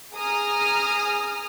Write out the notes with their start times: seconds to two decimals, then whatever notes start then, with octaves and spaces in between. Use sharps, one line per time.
0.14 G#4 A#5 D#6 F6